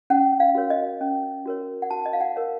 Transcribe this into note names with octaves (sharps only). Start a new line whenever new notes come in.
C#4 F#5
F5
F#4 A#4 C#5
D#5
C#4
F#4 A#4 C#5
F#5
F#4 A5
D#5
F5
F#5
A#4 C#5